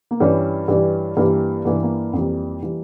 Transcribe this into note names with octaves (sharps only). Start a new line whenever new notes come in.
A#3
G2 E3 G3 C#4
G2 E3 G3
G2 E3 G3 A#3
G2 E3 G3 A#3
A#3
F2 E3 G3
E3 G3